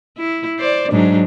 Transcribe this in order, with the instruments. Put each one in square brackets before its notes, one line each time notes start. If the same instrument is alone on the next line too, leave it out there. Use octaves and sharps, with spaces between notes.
[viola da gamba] E4
C5 D5
G#2 F#3 D4